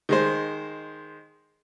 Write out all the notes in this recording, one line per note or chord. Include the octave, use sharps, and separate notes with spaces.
D#3 G#3 C5